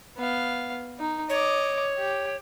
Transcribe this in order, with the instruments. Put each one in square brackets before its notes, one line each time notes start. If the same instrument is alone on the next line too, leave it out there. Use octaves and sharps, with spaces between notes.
[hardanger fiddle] B3 F5
D#4
[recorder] C#5 [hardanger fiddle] D#5 D6
[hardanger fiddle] G4